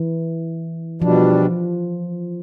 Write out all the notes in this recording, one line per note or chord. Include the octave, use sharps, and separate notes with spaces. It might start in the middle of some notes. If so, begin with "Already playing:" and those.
Already playing: E3
B2 F3 G3 D4